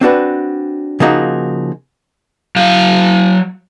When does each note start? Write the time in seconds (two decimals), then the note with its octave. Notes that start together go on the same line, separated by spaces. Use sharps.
0.01 C4 D4 F#4 B4
1.00 C#3 F3 A#3 D#4 F#4
2.56 F#3 F5